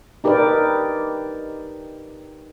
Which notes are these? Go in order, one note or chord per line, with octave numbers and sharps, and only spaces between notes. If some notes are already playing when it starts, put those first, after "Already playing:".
D#4 G4 A#4 B4 D5